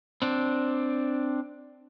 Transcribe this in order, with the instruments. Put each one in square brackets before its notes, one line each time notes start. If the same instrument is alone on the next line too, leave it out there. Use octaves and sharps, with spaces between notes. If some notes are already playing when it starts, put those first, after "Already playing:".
[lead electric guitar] C4 D4